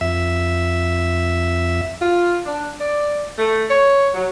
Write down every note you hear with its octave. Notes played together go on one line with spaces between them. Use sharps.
F2 E5
F4
D4
D5
A3
C#5
F#3